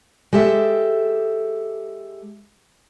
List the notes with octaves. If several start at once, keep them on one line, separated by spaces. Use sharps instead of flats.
G#3 G4 A4 E5